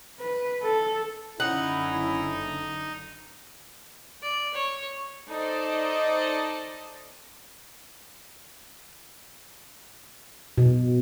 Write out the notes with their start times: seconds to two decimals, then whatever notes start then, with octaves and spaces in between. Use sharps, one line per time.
0.20 B4
0.63 A4
1.40 F#1 D3 C#4 D#4 E4 F#5
4.22 D5
4.53 C#5
5.30 D#4 A4 C5 D5 D#5
10.58 B2